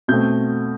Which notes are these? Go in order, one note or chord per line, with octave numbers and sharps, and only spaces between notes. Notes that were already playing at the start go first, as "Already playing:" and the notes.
B2 A3 C4 G6